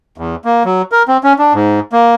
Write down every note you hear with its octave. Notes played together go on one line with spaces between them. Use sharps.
E2
A#3
F#3
A#4
C4
C#4
D4
G#2
A#3